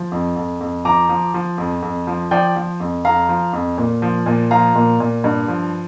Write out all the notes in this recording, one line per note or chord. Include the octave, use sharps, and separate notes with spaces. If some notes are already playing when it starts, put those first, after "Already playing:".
Already playing: F3
F2
F2
F2
F3 A#5 D6
F3
F3
F2
F2
F3
F3 D5 G5
F3
F2
F2 F5 A#5
F3
F2
A#2
F3
A#2
F3 F5 A#5
A#2
A#2
G2
F3